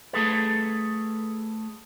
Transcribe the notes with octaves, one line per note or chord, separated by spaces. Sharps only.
A3 G#4 A4 B4